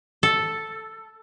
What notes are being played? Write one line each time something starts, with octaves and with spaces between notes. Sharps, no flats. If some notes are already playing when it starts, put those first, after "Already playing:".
A4